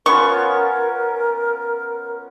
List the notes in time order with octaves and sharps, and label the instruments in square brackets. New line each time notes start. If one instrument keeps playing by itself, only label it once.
[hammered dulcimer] B3 C#4 F4 [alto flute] A#4 [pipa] C#6